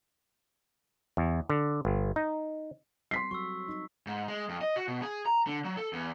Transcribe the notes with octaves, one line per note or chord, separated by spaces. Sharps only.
E2
D3
G1
D#4
G3 C4 C6 B6 C7
F#3 F#4 A4 C#6 E6
D#4
G#2
G#3
F2
D#5
F#4
B2
G#4
A#5
D3
F#3
A4
E2